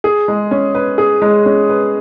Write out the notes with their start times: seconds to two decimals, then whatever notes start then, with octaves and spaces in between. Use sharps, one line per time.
0.04 G#4
0.28 G#3
0.51 C#4
0.75 B4
0.98 G#4
1.22 G#3
1.46 C#4
1.69 B4